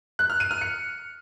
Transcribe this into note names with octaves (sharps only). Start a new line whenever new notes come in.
F#6
F6
D#7
F6
C#7